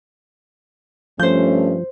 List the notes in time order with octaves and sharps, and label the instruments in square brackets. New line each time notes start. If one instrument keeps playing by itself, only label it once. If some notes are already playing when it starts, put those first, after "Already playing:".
[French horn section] G2 A3 C#4 [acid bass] F3 [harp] C5 G6